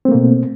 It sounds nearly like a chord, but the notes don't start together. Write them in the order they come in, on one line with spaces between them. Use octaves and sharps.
C4 A3 A#3 B2